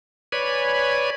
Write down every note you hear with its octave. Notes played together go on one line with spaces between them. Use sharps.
B4 C#5 D5 G#5 B5